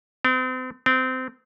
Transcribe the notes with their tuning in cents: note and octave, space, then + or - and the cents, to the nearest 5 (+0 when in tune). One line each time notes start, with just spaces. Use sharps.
C4 -40
C4 -25